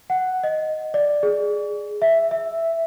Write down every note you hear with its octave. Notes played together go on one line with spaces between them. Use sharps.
F#5
D#5
D5
G#4
E5
E5